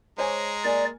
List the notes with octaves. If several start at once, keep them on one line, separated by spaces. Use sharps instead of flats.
G#3 C5 C#5 G#5 A#5
A#3 D5 G#5